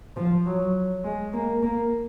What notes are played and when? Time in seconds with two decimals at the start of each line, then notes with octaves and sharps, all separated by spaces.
0.17 F3
0.46 F#3
1.04 G#3
1.33 A#3
1.63 A#3